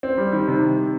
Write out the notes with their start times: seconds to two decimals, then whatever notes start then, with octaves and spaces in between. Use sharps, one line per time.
0.03 C4
0.18 G3
0.33 D#3
0.48 C3